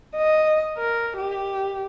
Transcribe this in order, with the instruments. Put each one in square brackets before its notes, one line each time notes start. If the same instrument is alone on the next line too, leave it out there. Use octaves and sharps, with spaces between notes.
[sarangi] D#5
A#4
G4